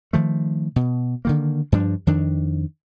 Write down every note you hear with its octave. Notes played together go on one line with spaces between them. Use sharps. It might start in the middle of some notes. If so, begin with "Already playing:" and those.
D#3 F3 A3
B2
D3 D#3 A#3
G2 F3 D4
F2 D#3 D4